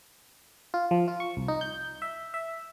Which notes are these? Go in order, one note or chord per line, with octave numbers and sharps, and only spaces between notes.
F4
F3
F4
C#6
C2
D#4
G6
E5
E5